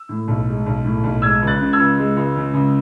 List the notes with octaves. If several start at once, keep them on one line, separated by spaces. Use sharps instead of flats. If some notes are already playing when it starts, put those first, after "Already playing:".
Already playing: E6
A2
B1
G#3
B1
A2
B1
G#3 E6 G#6
C#2
F#6 A6
C#3
E6 G#6
C#2
G#3
C#2
C#3
C#2